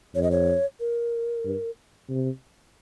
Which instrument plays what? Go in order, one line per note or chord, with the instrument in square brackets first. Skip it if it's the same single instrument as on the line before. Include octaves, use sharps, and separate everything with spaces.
[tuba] F2 [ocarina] C#5
[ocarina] D#5
C#5
A#4
[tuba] G2
C3